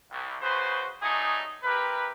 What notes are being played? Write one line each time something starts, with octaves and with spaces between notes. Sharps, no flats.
C2
C#3 F#4 B4 C5
F#3 G3 A3 D#4 G#4
C3 G4 A#4 B4